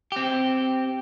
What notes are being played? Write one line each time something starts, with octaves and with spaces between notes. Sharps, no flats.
C4 G4